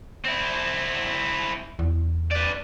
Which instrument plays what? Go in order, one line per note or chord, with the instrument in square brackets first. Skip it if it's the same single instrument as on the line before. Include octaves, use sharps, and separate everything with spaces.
[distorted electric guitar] C4 E4
[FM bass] E2
[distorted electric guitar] B4 D5